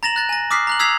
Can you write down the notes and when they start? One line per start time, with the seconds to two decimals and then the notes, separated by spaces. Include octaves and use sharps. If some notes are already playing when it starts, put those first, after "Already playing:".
0.03 A#5 A6 A#6 E7 F#7
0.16 F#6 A6 A#6
0.29 G#5 A#6
0.51 D6 D#6 F6 F#6 B6 C7
0.67 A#5 F#6 F#7
0.79 D#6 E6 G#6 B6 C7 F7